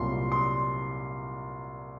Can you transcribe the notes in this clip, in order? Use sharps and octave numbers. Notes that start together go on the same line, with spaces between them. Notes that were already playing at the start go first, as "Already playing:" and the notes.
Already playing: C2 A#2 F#3 C6
C6